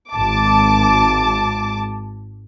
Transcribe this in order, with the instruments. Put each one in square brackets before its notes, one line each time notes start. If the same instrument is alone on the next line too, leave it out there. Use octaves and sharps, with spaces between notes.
[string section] G#1 A5 D6